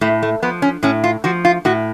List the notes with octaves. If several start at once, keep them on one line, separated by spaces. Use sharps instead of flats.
A2 A3
A3
F3 B3
C#4
A2 C#4
F4
F3 F#4
F4
A2 F#4